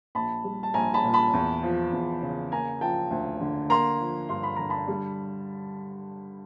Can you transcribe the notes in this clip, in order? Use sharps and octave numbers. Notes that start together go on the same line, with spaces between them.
A#1 A5 B5
G3
A5
A#1 G#5 A#5
A5 B5
A#2
A5 B5
E2
F3
E2
C#3
A#3 G#5 A#5
F3 G5 A5
D2
D3
A#3 A#5 C6
F3
G2 C6
B5
D3 A#5
A5 B5
G3